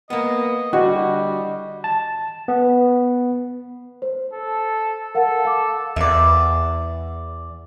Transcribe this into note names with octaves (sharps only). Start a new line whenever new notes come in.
A#3 B3 D#5
D3 G3 F#4 D#5
A5
B3
C5
A4
A4 A#4 F5 F#5
F5 D6
E2 D5 E5